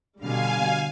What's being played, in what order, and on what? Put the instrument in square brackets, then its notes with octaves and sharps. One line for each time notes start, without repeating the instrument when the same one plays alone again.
[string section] B2 D3 G3 [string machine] F5 G#5